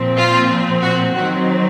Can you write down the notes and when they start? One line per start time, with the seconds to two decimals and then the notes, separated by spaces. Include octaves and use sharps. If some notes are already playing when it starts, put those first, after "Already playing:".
Already playing: A#2 F3 C4
0.16 F4
0.81 F#4
1.14 D#3 F#3 C4 F#4